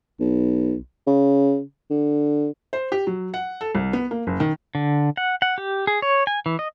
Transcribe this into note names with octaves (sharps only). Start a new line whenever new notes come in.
B1
C#3
D3
C5
G4
F#3
F#5
A4
C2
B3
A#3
F#1
D#3
D3
F#5
F#5
G4
G#4
C#5
G#5
E3
D#5